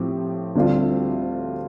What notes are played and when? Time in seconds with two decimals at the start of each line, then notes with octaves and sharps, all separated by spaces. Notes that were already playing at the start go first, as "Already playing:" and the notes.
Already playing: A2 F3 C4 G4
0.55 D2 D3 G3 C4 F4